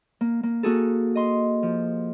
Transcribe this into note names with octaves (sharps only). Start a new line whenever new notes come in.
A#3
A#3
A#3 F#4 G#4 A4
D#5 C6
F3